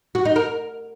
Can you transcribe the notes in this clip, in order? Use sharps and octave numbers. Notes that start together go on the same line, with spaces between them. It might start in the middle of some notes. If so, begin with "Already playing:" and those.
F#4
D#4
A#4